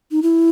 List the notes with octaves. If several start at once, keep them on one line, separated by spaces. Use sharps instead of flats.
D#4
E4